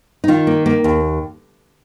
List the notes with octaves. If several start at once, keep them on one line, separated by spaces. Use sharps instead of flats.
D#4
D#3 F4
A#3
A#3
D#2